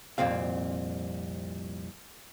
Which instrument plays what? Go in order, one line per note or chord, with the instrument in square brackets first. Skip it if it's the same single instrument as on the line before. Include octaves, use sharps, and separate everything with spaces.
[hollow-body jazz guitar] C2 F2 A#2 C4 F5